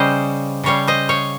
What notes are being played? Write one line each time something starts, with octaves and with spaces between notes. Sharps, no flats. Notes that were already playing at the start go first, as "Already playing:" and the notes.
Already playing: C#3 G3 C5 D#5
C#3 G3 C#5 F5
C5 D#5
C#5 F5